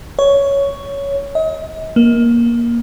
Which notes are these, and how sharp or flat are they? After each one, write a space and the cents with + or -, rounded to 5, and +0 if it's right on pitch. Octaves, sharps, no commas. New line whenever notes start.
C#5 +10
D#5 +40
A#3 +15